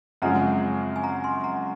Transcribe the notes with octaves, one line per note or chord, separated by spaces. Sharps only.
F#2 C#3 F3 G#3 C4 F#5 A#5
G#5
F#5 A#5
G#5 C6
F#5 A#5